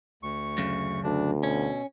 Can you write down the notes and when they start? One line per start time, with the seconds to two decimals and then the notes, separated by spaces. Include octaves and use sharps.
0.23 D2 C#6
0.58 F#2 C#3
1.04 D2 D4
1.43 B2 C#4